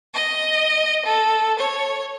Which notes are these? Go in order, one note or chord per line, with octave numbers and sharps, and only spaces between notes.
D#5
A4
C#5